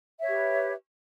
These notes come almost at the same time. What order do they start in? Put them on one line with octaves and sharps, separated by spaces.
E5 C#5 G4 B4